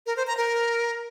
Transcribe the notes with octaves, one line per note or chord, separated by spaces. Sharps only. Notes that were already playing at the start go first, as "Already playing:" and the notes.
A#4
C5
A#5
A#4